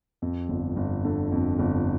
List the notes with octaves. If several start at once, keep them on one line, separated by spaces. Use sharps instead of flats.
F2
G1
G1
D3
F2
G1